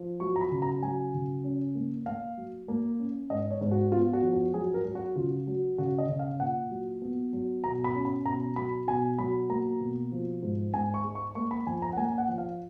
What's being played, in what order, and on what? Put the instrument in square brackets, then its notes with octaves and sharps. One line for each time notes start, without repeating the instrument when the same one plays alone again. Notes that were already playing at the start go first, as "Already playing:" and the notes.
Already playing: [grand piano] F3
F#3 C#6
A#5
B5
C#3
A#5
F#3 G#5
C#3
C#4
A#3
A#3 F5
F#3
A#3
C#4
G#2 D#5
C#5
G#2
F#4
B3 F4
F#4
F2
F#4
F#3 G#4
A#4
F#3
F#4
C#3 F4
F#3
C#3 F#4
D#5
C#3
F5
A#2 F#5
F#3
B3
F#3
B2 A#5
B5
C#4
B5
B2 A#5
F#3 B5
B2 G#5
F#3 B5
A#3 A#5
B2
F3
G#2
G#2 G#5
C#6
G#3
C#6
A#3 C#6
B5
F2 G#5
A#5
F#5
A#3 G#5
F#5
F3
F5